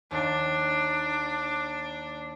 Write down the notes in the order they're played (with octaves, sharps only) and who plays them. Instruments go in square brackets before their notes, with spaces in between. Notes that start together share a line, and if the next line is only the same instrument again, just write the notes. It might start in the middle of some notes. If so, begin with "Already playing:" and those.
[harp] D#2 [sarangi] D4